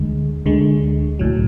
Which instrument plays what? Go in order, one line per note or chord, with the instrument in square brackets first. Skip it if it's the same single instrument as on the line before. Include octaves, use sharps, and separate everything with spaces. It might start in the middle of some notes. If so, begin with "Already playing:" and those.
Already playing: [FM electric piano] D2 D3 G#3
D2 D3 G#3
B1 A2 F#3